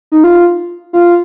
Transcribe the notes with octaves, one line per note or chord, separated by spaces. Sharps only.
D#4
F4
F4